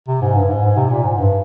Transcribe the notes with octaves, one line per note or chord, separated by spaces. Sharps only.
C3
G#2
G2
G#2
G#2
C3
A#2
G#2
G2